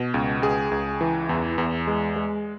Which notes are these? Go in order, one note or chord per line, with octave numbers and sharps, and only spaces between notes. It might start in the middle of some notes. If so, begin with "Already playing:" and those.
Already playing: B2
C#2
C#2 G#4
C#2
E3
E2
E2
G#3
G#3